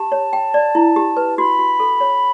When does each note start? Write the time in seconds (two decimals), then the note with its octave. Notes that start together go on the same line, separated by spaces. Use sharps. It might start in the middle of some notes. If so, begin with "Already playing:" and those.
Already playing: G4 A5
0.12 C#5
0.33 G5
0.54 D5
0.75 E4
0.96 G4
1.17 B4
1.38 F#4 B5
1.59 F#4
1.80 A4
2.01 C#5